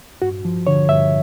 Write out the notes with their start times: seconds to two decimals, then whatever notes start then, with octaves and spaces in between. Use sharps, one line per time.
0.22 G2 F#4
0.45 F3
0.67 D3 C#5
0.89 G2 E5